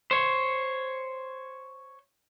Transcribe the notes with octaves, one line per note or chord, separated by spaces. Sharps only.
C5 C#5